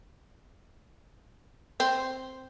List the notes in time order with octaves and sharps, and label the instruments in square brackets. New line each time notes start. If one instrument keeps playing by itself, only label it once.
[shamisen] C4